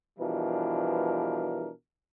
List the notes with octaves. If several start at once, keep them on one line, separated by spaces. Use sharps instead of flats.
B2 E3 F3 G3 D4 A#4